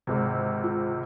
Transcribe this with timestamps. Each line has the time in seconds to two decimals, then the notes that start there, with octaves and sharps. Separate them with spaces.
0.07 G#1 C#2 C3
0.64 F4